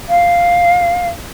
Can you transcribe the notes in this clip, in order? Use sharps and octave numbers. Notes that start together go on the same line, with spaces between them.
F5